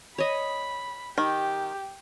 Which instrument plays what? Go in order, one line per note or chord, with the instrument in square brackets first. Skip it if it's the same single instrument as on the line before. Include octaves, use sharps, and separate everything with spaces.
[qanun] C#5 D#5 [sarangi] B5
[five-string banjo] D#3 [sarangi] G4